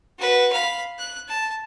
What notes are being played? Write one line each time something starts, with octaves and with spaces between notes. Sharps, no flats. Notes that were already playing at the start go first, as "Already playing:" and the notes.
F#4 B4
F5 B5
F#6
A5